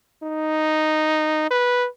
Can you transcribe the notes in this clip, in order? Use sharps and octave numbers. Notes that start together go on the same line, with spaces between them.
D#4
B4